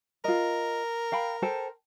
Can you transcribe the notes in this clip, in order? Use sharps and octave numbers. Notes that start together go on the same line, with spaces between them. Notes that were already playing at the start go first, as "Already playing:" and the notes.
F4 A#4 D#5
F5 G5 B5
A4 C5 G5